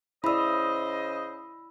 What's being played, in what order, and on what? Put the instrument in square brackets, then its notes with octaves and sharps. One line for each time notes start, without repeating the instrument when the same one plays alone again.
[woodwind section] C#3 C5 D#5 [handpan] E4 D5 [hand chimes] B5 E6